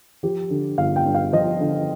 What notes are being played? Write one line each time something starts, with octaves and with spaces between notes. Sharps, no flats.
F3 G4
D3
G1 F5
G5
G2
F5
F3 D#5
D3